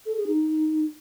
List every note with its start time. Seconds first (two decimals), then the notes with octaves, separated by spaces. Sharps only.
0.06 A4
0.16 G#4
0.27 D#4